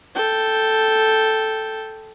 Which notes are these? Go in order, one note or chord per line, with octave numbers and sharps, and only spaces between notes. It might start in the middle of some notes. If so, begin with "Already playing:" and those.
A4 G5